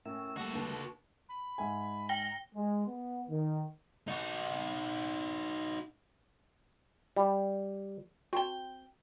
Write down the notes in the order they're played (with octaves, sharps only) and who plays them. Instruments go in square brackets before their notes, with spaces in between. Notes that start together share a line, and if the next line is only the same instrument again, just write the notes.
[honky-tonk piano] A2 [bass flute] C#4 [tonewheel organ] A#4 E5 E6
[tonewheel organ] G3 A3 A#3 [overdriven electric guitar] F#4 A4
[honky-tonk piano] D#2 D3 [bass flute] B4
[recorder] B5
[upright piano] G#2 E5 G#5
[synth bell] G5 A#6 G7 [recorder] A#5
[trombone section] G#3
B3
D#3
[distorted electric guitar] D#4 F#4
[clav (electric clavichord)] G3
[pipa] C4 G5 [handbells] F#4 A5